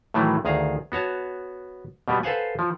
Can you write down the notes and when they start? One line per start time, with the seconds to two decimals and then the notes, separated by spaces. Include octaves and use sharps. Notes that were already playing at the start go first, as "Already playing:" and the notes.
0.14 A2 D#3 E3 F#3 A3
0.45 D2 D#3 G#4 F5 A#5
0.92 B3 F#4 C#5 A5
2.08 B2 G3 B3
2.23 A4 B4 C5 F5 F#5 G#5
2.59 F3